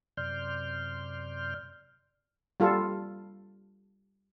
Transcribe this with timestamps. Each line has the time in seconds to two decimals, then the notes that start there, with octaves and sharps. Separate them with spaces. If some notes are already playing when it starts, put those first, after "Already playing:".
0.17 F#2 C3 D5 C6 F6 G6
2.60 G3 F4 A4